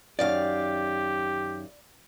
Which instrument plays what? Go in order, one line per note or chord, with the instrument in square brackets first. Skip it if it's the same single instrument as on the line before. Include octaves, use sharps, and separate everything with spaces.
[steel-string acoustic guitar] F#2 D#3 F5 [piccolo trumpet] G4 [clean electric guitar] D5